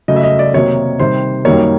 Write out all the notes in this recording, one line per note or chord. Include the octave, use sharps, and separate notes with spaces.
C#3 F#3 A3 D#5
E5
D#5
D5
C3 D#3 F#3 A#3 D#4 C#5
C3 D#3 G3 C5
F#2 D#3 G3 A#3 C#5